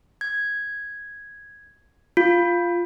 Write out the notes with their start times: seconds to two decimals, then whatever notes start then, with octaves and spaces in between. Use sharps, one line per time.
0.21 G#6
2.17 F4